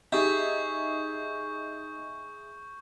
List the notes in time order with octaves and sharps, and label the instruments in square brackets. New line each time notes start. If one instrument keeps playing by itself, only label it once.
[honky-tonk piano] D#4 [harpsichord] G4 [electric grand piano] G#4 E5 [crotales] C#6 G6